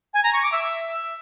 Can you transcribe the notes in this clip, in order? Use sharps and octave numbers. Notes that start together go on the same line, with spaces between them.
G#5
A#5
C#6
D6
E5